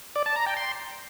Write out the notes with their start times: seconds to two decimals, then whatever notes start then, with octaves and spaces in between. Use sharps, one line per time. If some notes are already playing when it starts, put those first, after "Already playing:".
0.16 D5
0.26 A5
0.36 A#5
0.46 G5
0.57 C6